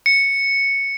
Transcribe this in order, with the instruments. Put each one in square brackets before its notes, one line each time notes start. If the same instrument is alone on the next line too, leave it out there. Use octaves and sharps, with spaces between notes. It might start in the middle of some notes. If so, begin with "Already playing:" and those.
[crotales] C#7